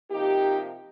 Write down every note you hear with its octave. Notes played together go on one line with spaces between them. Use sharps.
C3 F3 A#3 D#4 G4